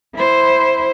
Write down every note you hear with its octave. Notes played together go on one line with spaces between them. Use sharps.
E4 C5